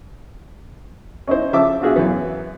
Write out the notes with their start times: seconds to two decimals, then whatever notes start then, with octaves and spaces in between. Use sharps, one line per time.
1.27 C#4 D#4 E4 C5
1.53 C#3 F3 E5 A5 D6
1.82 D4 F4 F#4 G#4 E5
1.96 F#2 E3 B3